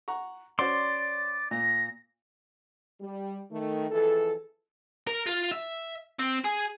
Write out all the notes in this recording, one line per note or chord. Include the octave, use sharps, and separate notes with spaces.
F#5 A#5 C#6
C#4 F#4 C5 D5 C6 A6
A#2 A#6
G3
D#3 A3
F2 E3 G#4 A4
A#4
F4
E5
C4
G#4